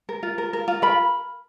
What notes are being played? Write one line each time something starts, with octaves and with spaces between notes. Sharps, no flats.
A#4
F4
A#4
A#4
F4
A#4 B5